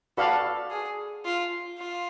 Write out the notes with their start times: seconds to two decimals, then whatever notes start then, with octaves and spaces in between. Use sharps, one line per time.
0.17 F#4 A4 B4 D5 F5 B5
0.71 G#4
1.25 F4
1.78 F4